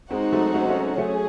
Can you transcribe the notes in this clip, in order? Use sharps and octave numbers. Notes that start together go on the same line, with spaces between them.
G#3 C4 D#4 F#4 C5 F#5
F#3 A3
A3 C#4
A3 C#4
F#3 A3 C#4 G#4